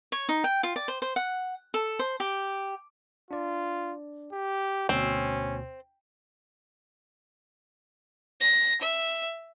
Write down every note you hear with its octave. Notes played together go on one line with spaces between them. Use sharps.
C#5
D#4
G5
F4
D5
C5
C5
F#5
A4
C5
G4
D4 F4 D5
G4
D2 B2 C4 C#4
A#6
E5